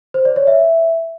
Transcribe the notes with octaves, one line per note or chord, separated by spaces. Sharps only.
C5
D5
C#5
E5